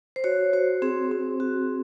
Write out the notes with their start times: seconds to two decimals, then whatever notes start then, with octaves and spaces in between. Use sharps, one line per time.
0.16 C5
0.24 F#4 C#5
0.53 F#4 C5
0.82 C4 G#4
1.11 C4
1.40 F#4